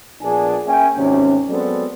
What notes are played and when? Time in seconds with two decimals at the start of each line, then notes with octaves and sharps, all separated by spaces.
0.22 A#1 B3 D4 G#4 G#5
0.67 A#3 C#4 E5 G5 G#5
0.96 G#1 D2 C3 C#4
1.49 F#3 G#3 B3 C4 A4 D5